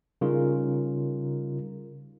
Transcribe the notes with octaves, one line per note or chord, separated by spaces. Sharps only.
C#3 G3 D#4 F4 A#4